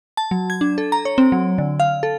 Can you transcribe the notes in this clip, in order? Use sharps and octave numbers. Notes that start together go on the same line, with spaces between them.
A5
F#3
G#6
D4
A4
A#5
C#5
C4
F#3
D3
F5
A4